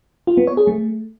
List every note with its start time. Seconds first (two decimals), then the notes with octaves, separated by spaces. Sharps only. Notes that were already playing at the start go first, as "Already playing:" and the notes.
0.27 F4
0.37 B3
0.47 C#5
0.57 G#4
0.67 A3